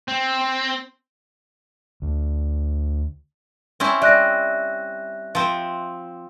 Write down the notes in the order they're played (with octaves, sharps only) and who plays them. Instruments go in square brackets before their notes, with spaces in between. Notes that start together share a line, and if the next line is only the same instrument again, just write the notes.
[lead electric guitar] C4
[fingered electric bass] D2
[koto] C4 C#4 E4
[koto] G3 [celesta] E5 F#6 A#6
[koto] F3 C4